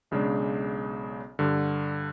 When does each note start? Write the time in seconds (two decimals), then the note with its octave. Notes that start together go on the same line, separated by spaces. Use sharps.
0.11 B1 C#3 G#3 D4
1.39 G2 D3